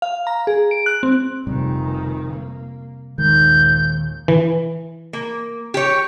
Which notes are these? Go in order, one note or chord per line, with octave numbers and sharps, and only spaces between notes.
F5
A#5
G#4
D7
F#6
C4
F1 C3 D#3 G3
A#3
A#1 D#2 D#3 G#3 G6
E3
A#3
G4 C#5